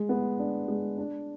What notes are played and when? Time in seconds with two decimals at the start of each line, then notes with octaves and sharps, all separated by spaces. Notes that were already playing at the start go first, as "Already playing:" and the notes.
Already playing: G#3
0.09 B3
0.39 D4
0.68 G#3
0.98 D4